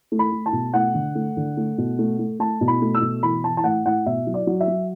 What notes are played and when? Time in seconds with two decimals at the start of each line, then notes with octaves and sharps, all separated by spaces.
0.12 A3
0.19 B5
0.32 A3
0.46 A5
0.53 B2
0.74 A3 F#5
0.94 D3
1.15 A3
1.37 D3
1.57 A3
1.78 B2
1.99 A3
2.19 A3
2.40 A3 A5
2.61 B2
2.68 B5
2.82 A3
2.95 E6
3.02 B2
3.23 E3 B5
3.44 E3 A5
3.57 A5
3.64 A2 F#5
3.86 A2 F#5
4.06 B2 E5
4.27 F#3
4.34 D5
4.47 F#3
4.61 E5
4.68 F#3